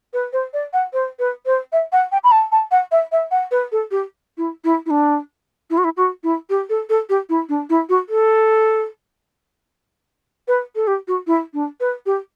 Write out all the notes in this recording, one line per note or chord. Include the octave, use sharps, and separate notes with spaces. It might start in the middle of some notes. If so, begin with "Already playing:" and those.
B4
C5
D5
F#5
C5
B4
C5
E5
F#5
G5
B5
A5
A5
F#5
E5
E5
F#5
B4
A4
G4
E4
E4
E4
D4
E4
F#4
E4
F#4
E4
G4
A4
A4
G4
E4
D4
E4
F#4
A4
B4
A4
G4
F#4
E4
D4
B4
G4